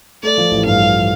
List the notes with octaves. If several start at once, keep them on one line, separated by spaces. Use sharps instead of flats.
A3 D5
F3
A1
G2 F5
A3
F3